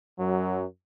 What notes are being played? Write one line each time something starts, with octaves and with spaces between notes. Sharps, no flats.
F#2 F#3